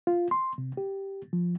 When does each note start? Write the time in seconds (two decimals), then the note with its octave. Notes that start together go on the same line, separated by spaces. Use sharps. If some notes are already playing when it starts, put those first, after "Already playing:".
0.07 F4
0.31 C6
0.58 C3
0.77 G4
1.33 F3